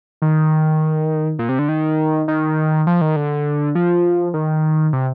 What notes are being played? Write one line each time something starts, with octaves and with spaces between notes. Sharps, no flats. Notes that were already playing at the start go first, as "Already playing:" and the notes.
D#3
A#2
C3
D3
D#3
D#3
F3
D#3
D3
F3
D#3
C3